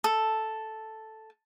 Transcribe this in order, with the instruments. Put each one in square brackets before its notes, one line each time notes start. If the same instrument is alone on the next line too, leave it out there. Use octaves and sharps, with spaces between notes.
[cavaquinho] A4